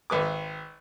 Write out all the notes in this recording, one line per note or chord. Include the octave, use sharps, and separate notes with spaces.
G#1 B4 D6